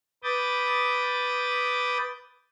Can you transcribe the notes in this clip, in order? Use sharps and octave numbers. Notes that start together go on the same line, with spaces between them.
B4 B5 D6 D#6 G6 A6